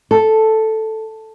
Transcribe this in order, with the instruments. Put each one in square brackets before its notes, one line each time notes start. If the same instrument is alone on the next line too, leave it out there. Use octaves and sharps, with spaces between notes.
[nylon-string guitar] A4